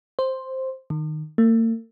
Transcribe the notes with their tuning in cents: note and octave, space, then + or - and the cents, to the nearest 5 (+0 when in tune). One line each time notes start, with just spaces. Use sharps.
C5 +5
D#3 -15
A#3 -45